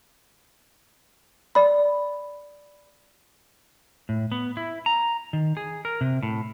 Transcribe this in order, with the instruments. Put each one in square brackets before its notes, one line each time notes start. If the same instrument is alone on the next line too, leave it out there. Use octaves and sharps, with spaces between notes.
[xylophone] D5 B5
[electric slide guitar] A2
B3
E4
A#5
D#3
G#4
A#4
C3
A2